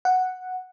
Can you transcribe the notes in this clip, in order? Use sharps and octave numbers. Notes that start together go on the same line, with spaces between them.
F#5